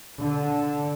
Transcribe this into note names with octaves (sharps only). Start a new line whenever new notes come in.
D3